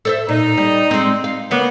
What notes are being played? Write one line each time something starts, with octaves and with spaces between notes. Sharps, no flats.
A4 C5 E5
A#2 D#4
G3
G#3 C4
F5
C#3 A#3 B3